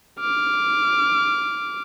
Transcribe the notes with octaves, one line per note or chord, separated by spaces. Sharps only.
D6 F6